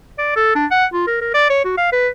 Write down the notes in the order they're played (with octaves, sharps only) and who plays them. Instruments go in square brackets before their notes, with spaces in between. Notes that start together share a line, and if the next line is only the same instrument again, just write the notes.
[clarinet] D5
A4
D4
F#5
F4
A#4
A#4
D5
C#5
F#4
F5
B4